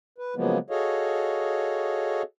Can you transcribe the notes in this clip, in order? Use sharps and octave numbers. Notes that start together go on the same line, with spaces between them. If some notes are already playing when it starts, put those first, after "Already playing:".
B4
C#3 F3 F#3 G#3 A#3 B3
F#4 G#4 A4 C#5 D#5 F5